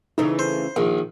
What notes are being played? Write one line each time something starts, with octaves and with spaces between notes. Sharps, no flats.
C#3 E3 A3 D#4
C5
A#1 D#3